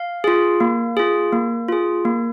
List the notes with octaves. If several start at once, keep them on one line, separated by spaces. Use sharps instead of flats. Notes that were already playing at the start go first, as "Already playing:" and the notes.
Already playing: F5
F4 G#4
A#3
F4 G#4
A#3
F4 G#4
A#3